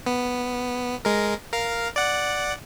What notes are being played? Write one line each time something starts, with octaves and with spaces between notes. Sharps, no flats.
B3
G#3 A#4
A#4 F5
D5 F#5